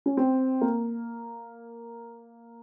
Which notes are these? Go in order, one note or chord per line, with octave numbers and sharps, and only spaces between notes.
C#4
C4
A#3